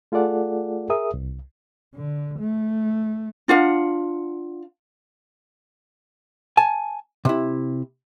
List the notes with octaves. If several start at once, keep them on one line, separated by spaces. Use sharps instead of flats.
A3 F4 G#4 A4 D5 F#5
G#4 A#4 E5 D#6
C2
D3
A3
D4 F4 F5 F#5
G#5 A5
C3 E4